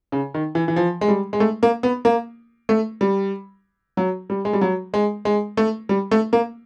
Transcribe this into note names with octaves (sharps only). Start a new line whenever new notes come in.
C#3
D#3
E3
E3
F3
G#3
G3
G#3
A3
A#3
B3
A#3
A3
G3
F#3
G3
G#3
G3
F#3
G#3
G#3
A3
G3
A3
A#3